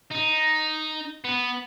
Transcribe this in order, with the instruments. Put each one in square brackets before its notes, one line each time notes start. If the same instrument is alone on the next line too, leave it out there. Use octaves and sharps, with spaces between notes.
[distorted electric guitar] D#4
B3